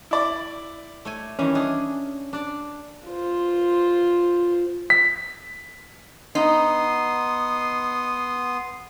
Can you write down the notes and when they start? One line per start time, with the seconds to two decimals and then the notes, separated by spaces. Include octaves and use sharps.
0.11 E4 D5 D6
1.05 A3 C#5 G#5
1.39 D#3 E3 G3 C#4
1.55 D4 G#4
2.33 D4 D5
3.08 F4 C5
4.90 B6
6.35 B3 D#4 C6 D#6